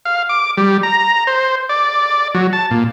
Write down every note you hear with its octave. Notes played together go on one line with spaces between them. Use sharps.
F5
D6
G3
A#5
C5
D5
F#3
A5
A#2